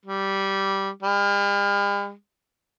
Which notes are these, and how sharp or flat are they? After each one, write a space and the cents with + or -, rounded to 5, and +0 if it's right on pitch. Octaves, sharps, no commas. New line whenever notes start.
G3 -10
G3 +45